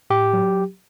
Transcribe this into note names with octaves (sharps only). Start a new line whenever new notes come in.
A2 G4
F#3